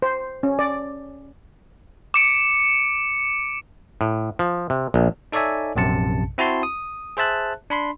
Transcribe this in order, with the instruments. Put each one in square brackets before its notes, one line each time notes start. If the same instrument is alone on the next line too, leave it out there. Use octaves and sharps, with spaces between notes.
[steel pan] C5
C#4
D5
[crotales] D6 C#7 D7
[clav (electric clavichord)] A2
F3
C3
A#1
[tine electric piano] D#4 A4 C#5 D5 E5 G#5
A#1 F#2 C3 A5 C#7
C4 E4 F#4 A5 C6
D#6
G#4 C5 E5 A5 F#6
D4 B5 C6